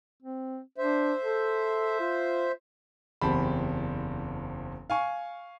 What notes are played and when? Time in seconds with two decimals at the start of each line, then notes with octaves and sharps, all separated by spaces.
0.23 C4
0.78 D4 C5 E5
1.23 A4
2.00 F4
3.21 F#1 E2 C4 G4 A5 B5
4.90 F5 G#5 C#6